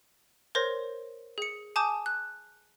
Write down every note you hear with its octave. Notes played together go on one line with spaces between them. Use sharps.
A#4 C5 C#5 C6 G6 A#6
G#4 C#7
G#5 A5 D6 D#6 G6 E7
F#6